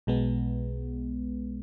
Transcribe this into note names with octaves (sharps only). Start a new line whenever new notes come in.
B1 B2 G#3 B3